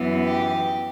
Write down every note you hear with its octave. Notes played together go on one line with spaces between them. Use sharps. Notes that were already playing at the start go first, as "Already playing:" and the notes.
Already playing: F#2 E3 B3
G4